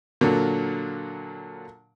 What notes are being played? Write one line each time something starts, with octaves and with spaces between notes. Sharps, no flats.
A#2 D3 F#3 A#3